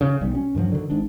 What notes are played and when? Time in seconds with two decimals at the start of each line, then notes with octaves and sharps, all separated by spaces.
0.01 C#3
0.21 B1 B2 G3
0.35 C#4
0.55 G2 D#3 F3 F#3
0.72 D3 D#3
0.89 G#1 G#2 D4